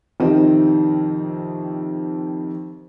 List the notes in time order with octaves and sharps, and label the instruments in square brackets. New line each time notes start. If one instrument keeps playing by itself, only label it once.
[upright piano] F2 C3 D#3 C4 D#4